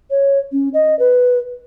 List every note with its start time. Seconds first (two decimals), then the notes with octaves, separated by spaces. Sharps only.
0.11 C#5
0.52 C#4
0.74 D#5
0.99 B4